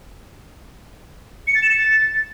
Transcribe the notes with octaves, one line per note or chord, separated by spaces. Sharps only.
C#7
A6
E7
C#7
A6